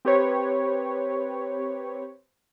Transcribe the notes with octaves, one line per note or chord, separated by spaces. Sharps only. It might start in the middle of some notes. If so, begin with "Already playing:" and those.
C4 G4 B4 C#5